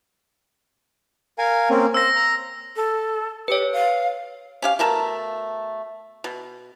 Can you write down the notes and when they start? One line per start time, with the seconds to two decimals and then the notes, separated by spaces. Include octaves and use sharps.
1.38 A#4 F5 G#5
1.70 A#3 C4 C#4
1.94 C5 E6 A#6
2.16 A#5
2.76 A4
3.48 G4 B4 C#5
3.73 F5
4.62 C#4 G4 F5
4.79 B2 A3 A#4 A5
6.24 B2